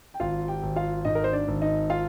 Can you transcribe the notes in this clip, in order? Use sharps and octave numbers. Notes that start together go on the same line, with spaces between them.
G5
G#1 F4 F5
G4 G5
G#1
F4 F5
G#2 D#4 D#5
A#4
C5
D4 D5
G#1
D#4 D#5
F4 F5